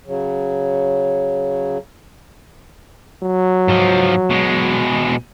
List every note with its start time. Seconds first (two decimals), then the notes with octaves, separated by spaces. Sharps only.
0.06 C#3 F#3
3.22 F#3
3.68 G#2 F3
4.30 B2 G#3